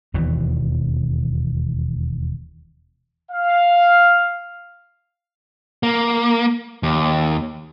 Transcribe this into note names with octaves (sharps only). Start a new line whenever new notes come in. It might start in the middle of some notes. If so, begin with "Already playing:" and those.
E1 D#2 B2 E3
F5
A#3
D#2